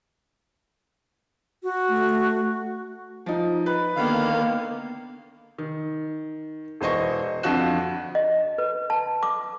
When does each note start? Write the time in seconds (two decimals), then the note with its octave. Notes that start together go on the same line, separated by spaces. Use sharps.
1.63 F#4
1.89 A3
3.26 F3 D#4
3.66 B4
3.96 D3 D#3 A#3 B3 F5
5.58 D#3
6.81 E1 E3 C5 D#5 C#6
7.43 F2 D3 F3 F#4 F#6 E7
8.15 D#5
8.58 B4
8.90 A5
9.23 D6